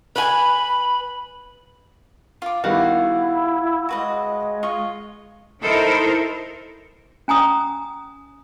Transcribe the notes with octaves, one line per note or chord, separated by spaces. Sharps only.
B4 G#5 B5
F4 D6
D#3 G3 B3 E4 F#4 F5 F#5
G#3 F#4 B4 D#5
F4 D#5 C#6
D#4 E4 A4 A#4 C5
C#4 G#5 A#5 D#6